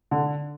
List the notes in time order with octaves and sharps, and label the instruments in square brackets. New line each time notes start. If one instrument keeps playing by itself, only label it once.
[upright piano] D3